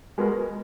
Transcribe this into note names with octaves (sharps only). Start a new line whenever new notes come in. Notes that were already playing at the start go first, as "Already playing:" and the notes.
G#3 B3 F#4 A#4